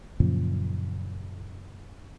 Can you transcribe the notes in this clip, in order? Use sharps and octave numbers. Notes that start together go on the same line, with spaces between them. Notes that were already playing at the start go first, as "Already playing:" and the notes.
F#2 A#2 C#3 F3